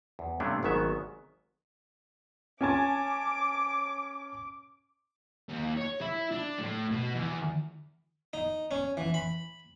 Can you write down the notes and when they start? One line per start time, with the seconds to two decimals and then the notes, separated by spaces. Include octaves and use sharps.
0.19 E2
0.40 G2 C3 A3 B3 C#4 D4
0.63 G#1 G#2 D#3 F#3 B3 E5
2.61 C#4 G#5 A5 D6
5.49 D#2
5.77 C#5
6.01 E4
6.31 D4
6.59 A2
6.91 B2
7.14 E2
8.33 D#4
8.71 C#4
8.97 E3
9.14 B5